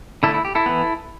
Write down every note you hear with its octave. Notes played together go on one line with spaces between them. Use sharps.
D3 A3 E4 A4
E4
G4
E4 A4
E3 B3